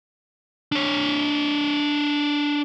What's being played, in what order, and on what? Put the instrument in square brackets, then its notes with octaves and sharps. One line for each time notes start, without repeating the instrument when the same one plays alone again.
[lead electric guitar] D4 C#5